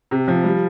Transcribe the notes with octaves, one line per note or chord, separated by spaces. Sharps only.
C3
F3
G3